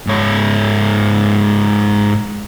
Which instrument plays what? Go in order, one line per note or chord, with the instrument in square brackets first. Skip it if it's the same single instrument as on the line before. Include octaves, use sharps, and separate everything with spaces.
[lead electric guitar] G#2 C#5